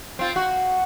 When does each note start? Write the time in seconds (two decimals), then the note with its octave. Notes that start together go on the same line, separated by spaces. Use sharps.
0.19 C4 F4
0.36 F#4